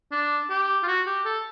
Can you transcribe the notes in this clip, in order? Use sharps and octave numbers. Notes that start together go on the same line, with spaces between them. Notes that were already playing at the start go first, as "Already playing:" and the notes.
D4
G4
F4
F#4
G4
A4